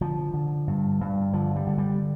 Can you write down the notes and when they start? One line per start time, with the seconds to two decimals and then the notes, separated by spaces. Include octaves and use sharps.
0.01 D3 F3
0.34 D3
0.67 G2
1.01 G2
1.33 D3 F3
1.56 G3
1.67 D3
1.78 G3